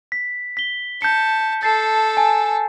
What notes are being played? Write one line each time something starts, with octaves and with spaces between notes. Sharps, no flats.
B6
B6 G7
A5 G6 C#7
A4 A5 A6 C7
G#5